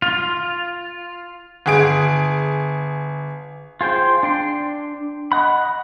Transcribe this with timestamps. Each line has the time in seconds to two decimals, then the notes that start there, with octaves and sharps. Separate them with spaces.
0.02 F4
1.66 G1 G#4 D7
3.81 F4 G#4 C5 G5
4.23 D4 G5 C6
5.32 D#5 F#5 B5